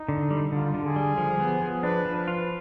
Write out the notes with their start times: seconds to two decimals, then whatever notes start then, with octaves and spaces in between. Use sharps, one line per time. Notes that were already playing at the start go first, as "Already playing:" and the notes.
Already playing: D#4
0.08 D3
0.30 G3
0.52 D3 F4
0.74 D3
0.85 G#4
0.96 G3
1.18 F3
1.40 B3
1.62 F3
1.83 D4 B4
2.05 F3
2.16 B4
2.28 F4